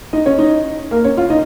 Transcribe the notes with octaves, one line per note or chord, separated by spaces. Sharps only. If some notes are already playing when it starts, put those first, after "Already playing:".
D#4 D#5
C#4 C#5
D#4 D#5
A#3 A#4
C#4 C#5
F4 F5
D#4 D#5